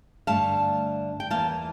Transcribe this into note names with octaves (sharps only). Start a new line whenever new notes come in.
G2 D3 A3 F5 A5
G5
E2 E3 A#3 F5 A5